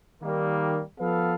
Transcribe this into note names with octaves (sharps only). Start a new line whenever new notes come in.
D#3 G3 A#3
F3 B3 A4 B4 F5